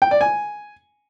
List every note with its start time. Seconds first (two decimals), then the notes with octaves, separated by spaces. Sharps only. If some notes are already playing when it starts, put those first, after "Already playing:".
0.02 G5
0.11 D5
0.21 G#5